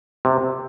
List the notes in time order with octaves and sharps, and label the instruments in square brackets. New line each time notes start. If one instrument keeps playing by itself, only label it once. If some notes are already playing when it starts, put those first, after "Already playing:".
[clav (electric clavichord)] C3